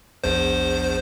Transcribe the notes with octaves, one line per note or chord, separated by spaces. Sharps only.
A#1 E2 C5